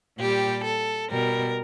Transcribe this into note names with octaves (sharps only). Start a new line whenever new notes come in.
A#2 G3 G4
A4
B2 G3 A#4